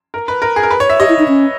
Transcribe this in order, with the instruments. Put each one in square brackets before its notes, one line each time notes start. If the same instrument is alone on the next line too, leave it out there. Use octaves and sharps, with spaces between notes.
[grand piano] A#4
B4
A#4
G#4
A#4
B4
C#5
E5
[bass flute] G4 [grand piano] D#5
[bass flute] E4
D#4
C#4